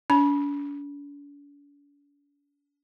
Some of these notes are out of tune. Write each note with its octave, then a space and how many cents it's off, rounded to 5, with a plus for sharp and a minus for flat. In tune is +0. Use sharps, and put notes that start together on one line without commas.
D4 -45 B5 -25